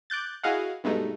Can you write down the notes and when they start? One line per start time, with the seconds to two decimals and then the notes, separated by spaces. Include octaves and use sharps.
0.10 D6 F#6 G6 A6
0.43 E4 F#4 G#4 D#5 F5 F#5
0.84 G2 B2 G#3 A3 D#4